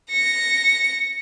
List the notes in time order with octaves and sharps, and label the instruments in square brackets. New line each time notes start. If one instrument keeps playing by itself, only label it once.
[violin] A#6 C#7